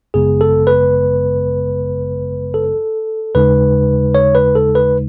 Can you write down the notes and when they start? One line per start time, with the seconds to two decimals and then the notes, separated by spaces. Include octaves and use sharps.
0.14 G#1 F#2 C#3 G#3 B3 G#4
0.41 A4
0.67 B4
2.54 A4
3.35 D#2 C#3 G#3 D#4 B4
4.15 C#5
4.35 B4
4.55 A4
4.75 B4